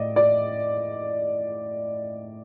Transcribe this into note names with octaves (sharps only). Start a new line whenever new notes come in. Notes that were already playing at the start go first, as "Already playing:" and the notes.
Already playing: A2 D5 D#5
D5